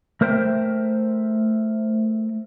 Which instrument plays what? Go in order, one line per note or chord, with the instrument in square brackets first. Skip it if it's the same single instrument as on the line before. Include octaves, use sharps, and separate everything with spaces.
[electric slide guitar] A3 A#4 C5 E5 G5